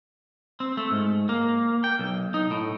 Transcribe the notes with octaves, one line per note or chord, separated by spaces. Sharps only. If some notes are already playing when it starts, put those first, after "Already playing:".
C4
A3
G#2
A#3
G5
B1
D#4
A2